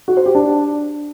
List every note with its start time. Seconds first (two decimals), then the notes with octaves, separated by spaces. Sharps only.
0.08 F#4
0.17 C5
0.26 G4
0.35 D4